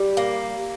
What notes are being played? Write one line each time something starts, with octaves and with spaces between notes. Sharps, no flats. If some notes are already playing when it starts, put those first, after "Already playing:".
Already playing: G3
A#3